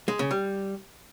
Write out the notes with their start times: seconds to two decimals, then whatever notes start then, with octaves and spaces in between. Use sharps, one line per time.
0.08 G#3
0.19 C#3
0.31 G3